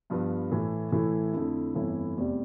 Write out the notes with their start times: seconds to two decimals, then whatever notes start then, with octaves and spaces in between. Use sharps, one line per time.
0.10 G2 F3 B3
0.51 A2 E3 A3
0.92 A2 E3 A3 E4
1.33 F2 D3 A3 E4
1.74 G1 F2 E3 A3 E4
2.16 F1 E2 C3 G3